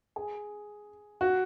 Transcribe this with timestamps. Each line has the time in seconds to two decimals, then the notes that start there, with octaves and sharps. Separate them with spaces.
0.16 G#4
1.21 F#4